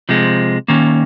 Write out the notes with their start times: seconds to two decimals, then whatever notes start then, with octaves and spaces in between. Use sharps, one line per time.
0.09 C3 F3 G#3
0.68 D#3 A#3 C#4